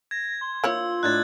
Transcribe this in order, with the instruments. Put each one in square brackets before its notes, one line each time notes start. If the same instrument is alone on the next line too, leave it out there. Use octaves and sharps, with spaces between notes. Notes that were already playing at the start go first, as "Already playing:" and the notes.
[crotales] G#6 [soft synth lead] A#6
[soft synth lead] C6
[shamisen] A#3 E4 C#5 [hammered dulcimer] F4 C5 [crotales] E6
[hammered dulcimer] A2 D4 D#4 [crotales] F#6 G#6 A6